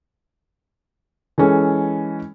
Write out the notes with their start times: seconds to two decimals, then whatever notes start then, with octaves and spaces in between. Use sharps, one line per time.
1.38 E3 G#3 C#4 A4